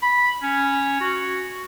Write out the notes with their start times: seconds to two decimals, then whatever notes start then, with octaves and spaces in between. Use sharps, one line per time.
0.02 B5
0.42 C#4
1.01 F#4